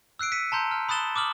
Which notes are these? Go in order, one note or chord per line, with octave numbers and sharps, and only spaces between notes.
E6 F#6 C7 D7
B6 C#7 D#7
A5 A#5 C6 G6
F6
B5 D#6 F#6 A6 E7 G7
D6 D#6 F6 F#7